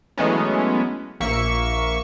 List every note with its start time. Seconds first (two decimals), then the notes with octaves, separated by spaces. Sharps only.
0.17 E3 F#3 G#3 A3 B3 C#4
1.20 A#1 A#3 E5 C#6